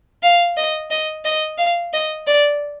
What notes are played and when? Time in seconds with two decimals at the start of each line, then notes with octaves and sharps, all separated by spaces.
0.23 F5
0.57 D#5
0.90 D#5
1.25 D#5
1.58 F5
1.93 D#5
2.27 D5